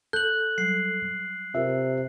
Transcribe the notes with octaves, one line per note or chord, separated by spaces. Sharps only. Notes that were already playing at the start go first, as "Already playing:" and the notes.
A4 F#6 G6 F#7
F#3 G3 C7
C3 F4 G4 A#4 E5